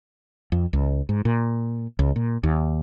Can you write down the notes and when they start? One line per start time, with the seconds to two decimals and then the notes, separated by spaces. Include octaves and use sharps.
0.52 F2
0.73 C#2
1.09 G#2
1.25 A#2
1.99 C#2
2.16 A#2
2.44 D#2